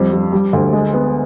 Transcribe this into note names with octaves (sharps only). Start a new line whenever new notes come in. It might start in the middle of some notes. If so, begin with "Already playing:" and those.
Already playing: F2 G3
G3
G3
D2
G#3
B3